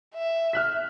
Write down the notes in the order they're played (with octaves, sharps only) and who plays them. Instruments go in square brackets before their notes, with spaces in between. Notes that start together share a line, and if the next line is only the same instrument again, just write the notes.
[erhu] E5
[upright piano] F6 F#6 B6